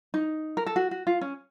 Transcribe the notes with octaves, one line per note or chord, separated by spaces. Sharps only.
D#4
A#4
A4
F#4
F#4
F4
C#4